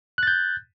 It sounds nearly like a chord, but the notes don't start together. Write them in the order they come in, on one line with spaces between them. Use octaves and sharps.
F#6 A6 G6